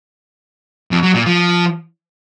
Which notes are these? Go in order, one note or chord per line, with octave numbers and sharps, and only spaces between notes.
F2
F#3
A#2
F3